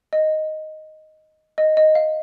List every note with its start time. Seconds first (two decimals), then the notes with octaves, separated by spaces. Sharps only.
0.13 D#5
1.58 D#5
1.77 D#5
1.95 F5